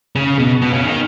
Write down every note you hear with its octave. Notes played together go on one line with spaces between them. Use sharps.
C#3
B2
B2
C#3
D#3